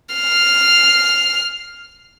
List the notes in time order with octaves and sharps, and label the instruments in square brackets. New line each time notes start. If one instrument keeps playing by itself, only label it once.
[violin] F6 C7